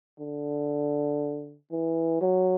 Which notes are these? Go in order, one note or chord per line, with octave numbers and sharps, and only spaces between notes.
D3
E3
F#3